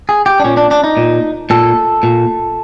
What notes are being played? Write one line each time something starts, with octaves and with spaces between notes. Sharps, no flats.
G#4
G4
D4
A#2 C#4
D4
D4
D#4
A#2
A#2 A4
A#2